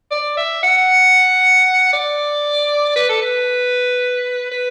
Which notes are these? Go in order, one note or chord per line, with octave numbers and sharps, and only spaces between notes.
D5
E5
F#5
D5
B4
A4
B4
B4